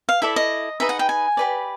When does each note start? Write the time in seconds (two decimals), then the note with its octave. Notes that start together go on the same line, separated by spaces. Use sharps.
0.09 F5
0.22 E4 A4 D5 E5
0.36 D#5
0.80 D#4 G#4 B4 D#5 E5
0.89 F#5
0.99 G5
1.09 G#5
1.37 G4 B4 D5